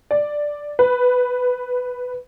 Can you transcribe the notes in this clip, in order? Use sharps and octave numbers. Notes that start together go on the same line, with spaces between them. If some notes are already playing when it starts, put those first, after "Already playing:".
D5
B4